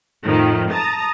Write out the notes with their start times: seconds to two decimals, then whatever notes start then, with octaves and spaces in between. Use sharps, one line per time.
0.25 F2 A2 D#3 F3
0.71 A5 A#5 D#6 A6